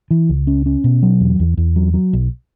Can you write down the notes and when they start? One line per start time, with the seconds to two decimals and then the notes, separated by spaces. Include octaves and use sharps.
0.11 E3
0.29 C#2
0.47 C#4
0.66 C#4
0.84 B2
1.03 F#3
1.20 E2
1.40 E2
1.57 E2
1.76 F#3
1.94 F#3
2.13 B1